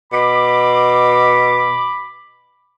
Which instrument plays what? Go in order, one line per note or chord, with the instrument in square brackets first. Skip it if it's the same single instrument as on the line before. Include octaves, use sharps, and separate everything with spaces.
[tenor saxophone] B2 [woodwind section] B5 D6